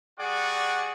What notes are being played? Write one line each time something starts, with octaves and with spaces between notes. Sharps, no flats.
G3 F#4 G#4 D5 F#5